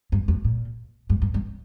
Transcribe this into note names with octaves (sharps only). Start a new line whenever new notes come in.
G2
F2
A#2
G2
G2
G2